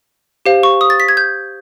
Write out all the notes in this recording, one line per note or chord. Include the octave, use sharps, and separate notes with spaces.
G4 C5 F5
C#6
D#6
A6
B6
G#6
G6